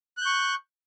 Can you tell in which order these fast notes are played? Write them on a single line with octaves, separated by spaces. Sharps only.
F#6 G6 C#6